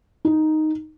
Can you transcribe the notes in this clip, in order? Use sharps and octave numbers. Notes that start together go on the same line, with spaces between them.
D#4